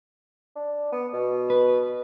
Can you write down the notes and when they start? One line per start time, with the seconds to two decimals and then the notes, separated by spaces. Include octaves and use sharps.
0.56 D4
0.92 B3
1.13 B2
1.50 B4